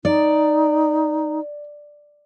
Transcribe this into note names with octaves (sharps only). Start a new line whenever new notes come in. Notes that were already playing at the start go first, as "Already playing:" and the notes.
D#4 D5